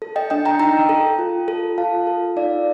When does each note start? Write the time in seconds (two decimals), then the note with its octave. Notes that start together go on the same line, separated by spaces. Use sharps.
0.02 A4
0.16 D#5 G5
0.30 D4 D#5 G5
0.45 G5 A#5
0.60 D#4 G5 A#5
0.89 A4
1.19 F4
1.48 A4
1.78 F4 F5 A5
2.07 A4
2.36 D#4 D5 F5